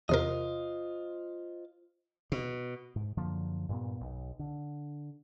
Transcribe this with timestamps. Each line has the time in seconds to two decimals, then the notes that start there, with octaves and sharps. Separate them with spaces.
0.09 E2 C3 F4 A#4 C5 D#5
2.32 B2
2.96 G#2
3.17 F#2 D3 F3 A#3
3.69 G2 A#2 B3
4.01 B1
4.39 D3